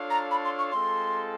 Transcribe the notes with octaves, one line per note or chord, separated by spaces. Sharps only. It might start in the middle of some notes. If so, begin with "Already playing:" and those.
Already playing: D4 F4 A4 C#5 F5
A#5
B5
C6
C#6
G#3 C4 F4 A4 C6